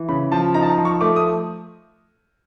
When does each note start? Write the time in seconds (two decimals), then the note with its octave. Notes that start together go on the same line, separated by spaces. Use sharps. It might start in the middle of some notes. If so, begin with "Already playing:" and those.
Already playing: E3
0.09 C#3 B5
0.32 F3 A5
0.54 D#4 A#5
0.63 A5
0.70 A#5
0.78 F3
0.85 C#6
1.01 A3 D6
1.16 D#6